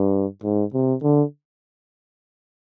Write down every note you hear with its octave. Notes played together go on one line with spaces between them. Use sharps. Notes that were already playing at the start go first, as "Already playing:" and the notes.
Already playing: G2
G#2
C3
D3